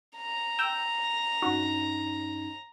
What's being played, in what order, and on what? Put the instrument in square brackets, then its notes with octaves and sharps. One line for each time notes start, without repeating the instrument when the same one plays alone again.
[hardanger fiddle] A#5
[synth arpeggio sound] G5 E6 G6
[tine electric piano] G2 C#4 D#4 [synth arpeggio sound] F#4